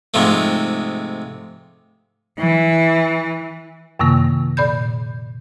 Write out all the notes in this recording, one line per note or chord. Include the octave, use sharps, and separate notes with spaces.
G#2 C3 F3 A3
E3
F#2 C3 D#3 A#3
A#2 D5 B5 G6